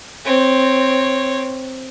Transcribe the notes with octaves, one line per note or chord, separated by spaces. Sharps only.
C4 C#5